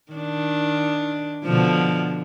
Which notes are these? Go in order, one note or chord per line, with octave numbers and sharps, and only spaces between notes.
D#3 D4
B2 D3 F3